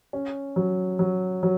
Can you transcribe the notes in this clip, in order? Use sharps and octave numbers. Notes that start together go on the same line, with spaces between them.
C#4
F#3
F#3
F#3